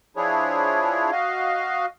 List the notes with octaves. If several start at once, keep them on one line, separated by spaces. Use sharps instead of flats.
F3 D4 E4 G#4 C#5
F#4 D#5 F5